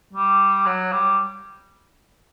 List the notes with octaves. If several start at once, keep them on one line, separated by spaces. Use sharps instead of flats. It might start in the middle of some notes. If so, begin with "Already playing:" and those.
G3
F#3
G3